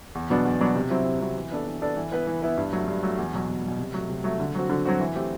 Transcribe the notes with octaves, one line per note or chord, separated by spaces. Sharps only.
E2
B2 F#3 B3 D4
E2
B2 F#3 B3 D4
C3
F#3 C4 E4
C3
F#3 C4 E4
E3
B3 D4 A4 D5
E3
B3 D4 A4 D5
E3
B3 E4 B4
E3
B3 E4 B4
G2
F#3 A3
G2
F#3 A3
E2
B2 F#3
E2
B2 F#3
C3
F#3 A3
C3
F#3 A3
D3
F#3 C4 F#4
D3
F#3 C4 F#4
E3
A3 C4 G4